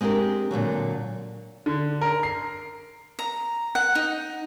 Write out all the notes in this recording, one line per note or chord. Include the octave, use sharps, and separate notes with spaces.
G#3 C4 D4 G4 A#4
A#2 D3 E3 F#3
D3
A#4
C7
A#5
F#5
D#4